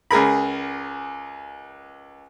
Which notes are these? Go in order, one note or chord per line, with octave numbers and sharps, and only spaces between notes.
C#2 G#4 A#4 B5